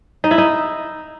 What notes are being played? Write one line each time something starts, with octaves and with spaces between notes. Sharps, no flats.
D#4
E4
D#4